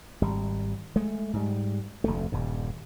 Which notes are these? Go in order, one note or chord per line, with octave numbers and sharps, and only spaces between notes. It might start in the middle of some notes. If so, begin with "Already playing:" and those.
G#1 G3
G#3 A3
G#2 G3
F1 D2 A3
D#1 G2